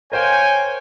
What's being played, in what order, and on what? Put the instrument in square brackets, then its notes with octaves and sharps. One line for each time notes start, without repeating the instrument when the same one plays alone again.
[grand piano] A#4 C5 F5 [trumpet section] C#5 G5 G#5